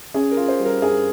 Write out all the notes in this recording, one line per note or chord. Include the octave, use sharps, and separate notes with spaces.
C#4 G#4
A#4
F4
C5
G3
A#4
G2 G#4